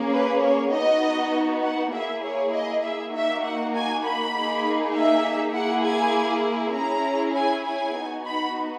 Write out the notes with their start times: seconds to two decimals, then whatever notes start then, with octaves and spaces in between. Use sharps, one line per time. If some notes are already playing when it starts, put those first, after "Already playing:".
Already playing: A#3 C#4 G#4
0.12 B4
0.42 C#5
0.71 B3 D#4 F#4 D#5
1.62 F#5
1.92 A#3 E4 G#4 E5
2.23 C#5
2.53 D#5
2.82 E5
3.13 A#3 D#4 F#4 E5
3.43 F#5
3.72 G#5
4.03 B5
4.33 A#3 D#4 G#4
4.94 E5
5.54 A#3 E4 G#4 F#5
5.84 G#5
6.74 C#4 E4 G#4 A#5
7.35 G#5
7.64 G#5
7.95 B3 D#4 F#4
8.25 B5